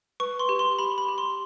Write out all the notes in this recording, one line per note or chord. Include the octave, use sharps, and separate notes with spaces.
B4 C#6
C6
G4
C6
G4 B5
B5
G4
C6